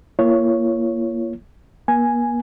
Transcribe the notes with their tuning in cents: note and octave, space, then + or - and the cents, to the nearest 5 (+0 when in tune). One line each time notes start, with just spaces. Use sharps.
A#3 +15 F4 -45 C#5 +0
A#3 +45 G#5 +0